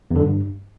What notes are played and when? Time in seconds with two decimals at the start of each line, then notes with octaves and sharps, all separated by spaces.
0.11 E2
0.16 D3
0.21 G2